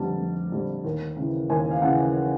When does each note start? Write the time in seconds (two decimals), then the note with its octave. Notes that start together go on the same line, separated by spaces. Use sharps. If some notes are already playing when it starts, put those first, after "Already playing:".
Already playing: F1 F2 D3 G3 A5
0.20 F1
0.52 F2 D3 G3
0.84 D#2
1.16 C#3 E3
1.50 D#2 G#5
1.71 F5
1.82 C#3 E3 F#5